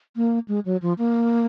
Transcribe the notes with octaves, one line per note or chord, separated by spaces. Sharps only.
A#3
G#3
F#3
F3
A#3